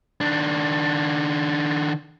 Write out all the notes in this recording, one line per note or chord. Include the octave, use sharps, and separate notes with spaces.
D#3 D4